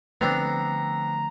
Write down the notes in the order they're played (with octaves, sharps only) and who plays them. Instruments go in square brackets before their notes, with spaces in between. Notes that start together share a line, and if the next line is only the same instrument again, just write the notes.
[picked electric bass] D3 F3 A3 [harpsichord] B3 C4 D4 [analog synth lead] A#5